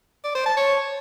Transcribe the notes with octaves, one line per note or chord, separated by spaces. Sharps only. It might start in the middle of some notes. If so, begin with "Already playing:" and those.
D5
C5
A5
C#5